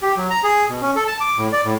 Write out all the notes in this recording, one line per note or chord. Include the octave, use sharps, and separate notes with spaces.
G4
F#3
A#5
G#4
B2
C#4
A4
A5
D6
A2
D5
A2